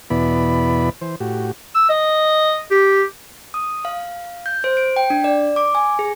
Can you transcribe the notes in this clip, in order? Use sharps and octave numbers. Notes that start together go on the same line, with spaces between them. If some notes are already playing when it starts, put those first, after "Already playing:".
E2 B2 B3 E4 D5 B5
E3 C5
A2 F#4 G4
E6
D#5
G4
D#6
F5
G6
C5
D7
G5
D4
D5
D6
G#5
G#4